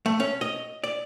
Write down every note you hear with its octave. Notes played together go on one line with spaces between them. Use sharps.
A3
C#4
D#5
D5